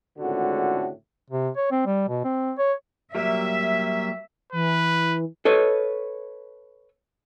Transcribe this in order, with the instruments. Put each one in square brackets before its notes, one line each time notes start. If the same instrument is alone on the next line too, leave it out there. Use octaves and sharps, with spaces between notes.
[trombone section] G#1 C#2 A2 D3 F#4
[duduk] C3
C#5
C4
G3
B2
C4
C#5
[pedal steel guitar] F#3 G3 A#3 [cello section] E5
[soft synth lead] E3 [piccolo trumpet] B4
[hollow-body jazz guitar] A4 B4 C#5 D#5